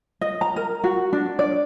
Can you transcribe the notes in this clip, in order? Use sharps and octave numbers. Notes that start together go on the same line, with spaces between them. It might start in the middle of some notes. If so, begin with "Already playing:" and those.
D#5
A#5
A#4
F#4
D4
D5